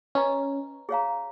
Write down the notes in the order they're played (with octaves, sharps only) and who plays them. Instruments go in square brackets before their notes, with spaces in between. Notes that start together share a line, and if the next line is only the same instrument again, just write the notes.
[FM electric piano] C#4 [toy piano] B4 D#5 A#5 C#6
[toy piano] G#4 C#5 F5 A#5